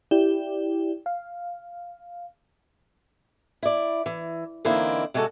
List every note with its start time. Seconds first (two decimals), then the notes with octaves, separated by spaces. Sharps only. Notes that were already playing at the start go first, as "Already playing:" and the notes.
0.11 E4 G4 D5 G5
1.06 F5
3.63 E4 D5
4.06 E3
4.65 D3 E3 A#3 C4 D#4 E4
5.14 C3 G#3 F#4 G#4 A4